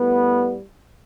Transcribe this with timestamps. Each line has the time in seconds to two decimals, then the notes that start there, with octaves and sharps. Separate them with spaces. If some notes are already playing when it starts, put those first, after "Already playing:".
Already playing: A2 G3 B3